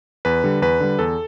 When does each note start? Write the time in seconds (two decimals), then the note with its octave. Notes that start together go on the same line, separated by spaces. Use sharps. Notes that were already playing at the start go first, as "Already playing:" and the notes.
0.25 E2 B4
0.44 D3 G3
0.62 E2 B4
0.80 D3 G3
0.99 E2 A4